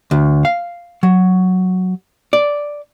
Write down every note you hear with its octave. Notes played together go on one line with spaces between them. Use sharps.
D2
F5
F#3
D5